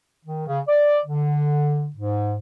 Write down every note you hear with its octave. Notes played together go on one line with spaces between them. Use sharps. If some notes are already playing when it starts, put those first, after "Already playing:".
D#3
C#3
D5
D3
G#2